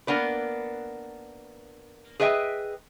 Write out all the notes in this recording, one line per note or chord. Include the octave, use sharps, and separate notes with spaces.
A#3 B3 D4 B4
G#4 B4 D#5 E5 G5